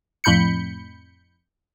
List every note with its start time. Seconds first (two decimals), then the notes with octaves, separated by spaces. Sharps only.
0.24 F2 A2 B5 G6 C#7